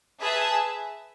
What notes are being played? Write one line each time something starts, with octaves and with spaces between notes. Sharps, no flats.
G#4 B4 E5 A5